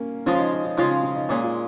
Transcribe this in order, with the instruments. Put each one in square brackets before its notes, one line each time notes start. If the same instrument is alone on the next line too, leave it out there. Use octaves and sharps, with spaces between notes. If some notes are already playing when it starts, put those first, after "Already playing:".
Already playing: [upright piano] A#3 C#4
[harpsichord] C#3 F3 G#3 F4 [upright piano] C#4
[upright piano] D#4
D#4
D#4
[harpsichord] C#3 F3 G#3 F4 [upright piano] D#4
[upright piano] C#4
C#4
D#4
[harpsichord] A#2 G#3 C#4
[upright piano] F4